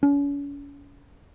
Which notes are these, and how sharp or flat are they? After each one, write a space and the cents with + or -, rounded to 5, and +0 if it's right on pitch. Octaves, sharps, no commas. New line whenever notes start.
C#4 +40